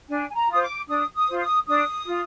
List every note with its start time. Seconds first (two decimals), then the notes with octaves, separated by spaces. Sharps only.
0.09 D4 G#5
0.29 G#5
0.35 A#5
0.49 F4 C5 D#6
0.62 D6
0.88 D4 D#6
1.15 D#6
1.28 F4 C5
1.40 D#6
1.67 D4 D#6
2.06 F4